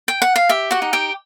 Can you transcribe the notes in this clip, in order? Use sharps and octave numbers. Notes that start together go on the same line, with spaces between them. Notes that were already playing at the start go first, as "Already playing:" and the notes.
G5
F#5
F5
G4 E5
F#4 F#5
D#4
G4 G5